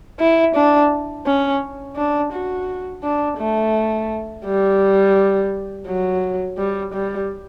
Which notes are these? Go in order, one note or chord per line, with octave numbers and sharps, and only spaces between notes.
E4
D4
C#4
D4
F#4
D4
A3
G3
F#3
G3
G3